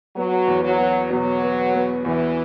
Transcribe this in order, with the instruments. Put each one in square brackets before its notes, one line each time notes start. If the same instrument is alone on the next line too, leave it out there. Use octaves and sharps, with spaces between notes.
[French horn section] F#3 [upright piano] B3
[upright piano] E2
[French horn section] F#3
[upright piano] B3
[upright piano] B2 [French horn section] F#3
[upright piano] B3
B3
[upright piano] E2 [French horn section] E3